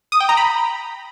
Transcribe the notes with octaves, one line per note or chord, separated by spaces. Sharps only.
D#6
G5
A#5
B5